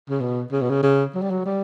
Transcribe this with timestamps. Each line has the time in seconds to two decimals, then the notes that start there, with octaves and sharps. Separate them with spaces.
0.10 C#3
0.21 B2
0.51 C#3
0.62 B2
0.70 C#3
0.83 C#3
1.15 F#3
1.22 G3
1.30 F#3
1.46 G3